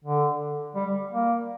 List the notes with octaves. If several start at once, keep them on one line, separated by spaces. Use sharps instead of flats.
D3
G3
A#3